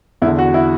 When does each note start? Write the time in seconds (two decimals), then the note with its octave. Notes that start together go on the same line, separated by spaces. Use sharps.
0.22 E2 E4
0.26 D3
0.39 F#4
0.54 E4